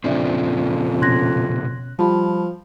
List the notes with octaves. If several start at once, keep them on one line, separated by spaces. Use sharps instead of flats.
F2 A#2 C#3 C4 D4 D5 E5
B2 C#4 C6 F#6 G#6 A#6
F3 G3 F4 G4 A5 B5